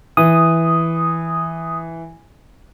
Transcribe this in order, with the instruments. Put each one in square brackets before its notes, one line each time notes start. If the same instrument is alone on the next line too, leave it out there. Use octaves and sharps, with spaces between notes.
[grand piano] E3 [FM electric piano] D#6